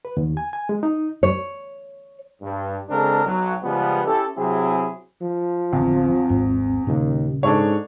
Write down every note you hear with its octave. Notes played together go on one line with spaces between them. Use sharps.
B4
D#2
G#5
G#5
G#3
D#4
C#5
G2
C#3 G#3 C4 D4 A4 A#4
B1 F#3
C#3 F3 G3 G#3 B3
C#4 E4 G4 A4
C3 F#3 C4 E4 G#4
F3
A1 E2 D3 C4
G#1 D#2 G#2
D#2 A#2 C#3 G3 C#4
G#2 D4 A4 C#5